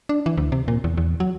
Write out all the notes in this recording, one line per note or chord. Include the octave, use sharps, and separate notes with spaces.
D4
E3
D2
C3
A#2
E2
E2
F#3